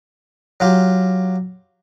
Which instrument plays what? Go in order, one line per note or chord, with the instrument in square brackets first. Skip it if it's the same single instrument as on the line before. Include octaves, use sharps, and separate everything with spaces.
[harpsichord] F#3 F4 G4